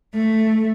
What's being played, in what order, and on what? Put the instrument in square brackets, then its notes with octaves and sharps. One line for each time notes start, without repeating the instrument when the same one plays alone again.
[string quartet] A3